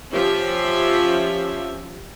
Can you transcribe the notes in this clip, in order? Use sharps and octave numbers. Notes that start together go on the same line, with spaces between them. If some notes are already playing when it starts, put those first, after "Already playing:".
F3 C#4 F4 G4 E5